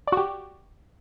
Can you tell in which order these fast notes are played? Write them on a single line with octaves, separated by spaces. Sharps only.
D5 F#4 G4